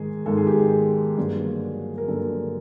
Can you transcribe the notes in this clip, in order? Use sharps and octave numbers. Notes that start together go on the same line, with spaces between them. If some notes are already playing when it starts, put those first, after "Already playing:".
Already playing: G#2 D#3 G#3 G#4
G#2 D#3 G#3 A4
G#4
G4
G#4
G2 D3 F#3 A#3
A#4
G2 D3 F#3 A#3 A4